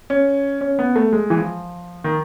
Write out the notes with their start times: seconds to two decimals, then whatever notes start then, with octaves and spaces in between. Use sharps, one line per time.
0.10 C#4
0.61 C#4
0.79 B3
0.96 A3
1.13 G#3
1.30 E3
1.38 F3
2.04 D#3